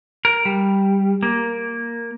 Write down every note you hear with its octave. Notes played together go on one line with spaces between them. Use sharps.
A#4
G3
A#3